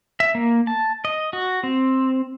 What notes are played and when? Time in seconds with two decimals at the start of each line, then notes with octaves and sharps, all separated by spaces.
0.20 E5
0.35 A#3
0.67 A5
1.05 D#5
1.33 F#4
1.63 C4